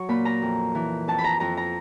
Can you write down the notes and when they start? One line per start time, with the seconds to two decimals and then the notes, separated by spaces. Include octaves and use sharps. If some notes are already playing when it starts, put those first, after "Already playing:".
Already playing: F#3 C#6
0.09 A#2 B5
0.25 A#5
0.42 F2
0.75 E3
1.08 F2 A5
1.18 B5
1.24 A#5
1.40 F2 A#5
1.57 A#5